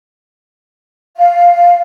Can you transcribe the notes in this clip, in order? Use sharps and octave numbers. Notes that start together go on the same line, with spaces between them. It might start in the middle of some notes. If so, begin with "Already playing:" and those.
F5